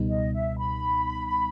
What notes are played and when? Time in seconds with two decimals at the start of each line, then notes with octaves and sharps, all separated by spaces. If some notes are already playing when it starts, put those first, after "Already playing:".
Already playing: C#2 B2 G3 B3 D#4
0.09 D#5
0.33 E5
0.58 B5